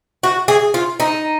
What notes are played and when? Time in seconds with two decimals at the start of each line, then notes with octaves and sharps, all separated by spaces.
0.23 F#4
0.48 G#4
0.74 F4
1.00 D#4